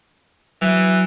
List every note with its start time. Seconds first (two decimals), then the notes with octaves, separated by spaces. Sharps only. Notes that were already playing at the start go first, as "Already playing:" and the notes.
0.62 E3 F#3